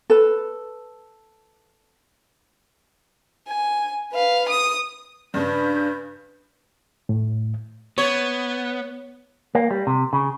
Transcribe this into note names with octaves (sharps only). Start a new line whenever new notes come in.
A4 B4
G#5
B4 F5
D#6
G2 C#3 D4 B4 G6
A2
B3 C#5
A#3
G3
C3
C#3